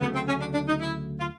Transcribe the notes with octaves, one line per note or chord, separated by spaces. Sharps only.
D2 C#3 F#3 A3 B3
C4
C#4
D4
D4
D#4
E4
F4